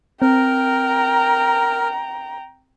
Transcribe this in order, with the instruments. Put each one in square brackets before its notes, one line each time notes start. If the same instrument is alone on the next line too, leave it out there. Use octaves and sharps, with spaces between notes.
[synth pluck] C4 [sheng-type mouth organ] A#4 [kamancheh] G5 A#5